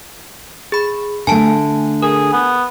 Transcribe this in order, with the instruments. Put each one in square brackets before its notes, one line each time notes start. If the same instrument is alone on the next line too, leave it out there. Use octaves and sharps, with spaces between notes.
[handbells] G#4 B5
[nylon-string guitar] D3 A3 [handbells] G#5 A5
[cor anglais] G#4 [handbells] A#4
[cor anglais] B3